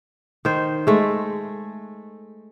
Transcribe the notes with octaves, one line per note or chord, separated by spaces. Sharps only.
D#3 C5
G#3 A3